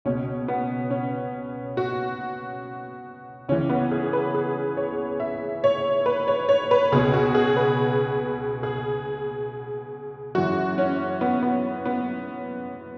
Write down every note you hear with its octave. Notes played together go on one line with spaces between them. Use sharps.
C#2 B2 C#4
B3
C#4
F#4
C#2 C#3 E3 C#4
B3
G#4
B4
G#4
C#5
E5
C#5
B4
C#5
C#5
B4
C#2 B2 G#4
F#4
G#4
B4
G#4
F#2 E3 F#4
C#4
B3
B3
B3